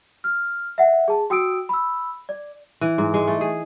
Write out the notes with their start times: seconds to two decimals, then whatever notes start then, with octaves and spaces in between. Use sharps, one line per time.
0.24 F6
0.78 E5 F#5
1.08 G#4 A5
1.30 F#4 G5 D#6 E6 D7
1.69 B5 E6
2.29 D5
2.81 E3
2.98 G#2
3.14 G#3
3.27 A3
3.41 G#4